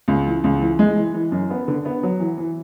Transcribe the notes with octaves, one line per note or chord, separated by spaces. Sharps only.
C#2
E3
C#2
E3
G#3
E3
E3
F#2
B3
D3
B3
F#3
E3
E3